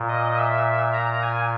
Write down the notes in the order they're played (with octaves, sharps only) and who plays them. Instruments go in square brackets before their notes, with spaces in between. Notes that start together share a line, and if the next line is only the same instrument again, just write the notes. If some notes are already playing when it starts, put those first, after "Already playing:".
Already playing: [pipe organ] A#2
D#5
E5
A#5
G#5